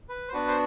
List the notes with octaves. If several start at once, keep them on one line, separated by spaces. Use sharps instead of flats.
B4
C5
B3 D4 F#4 B4
C5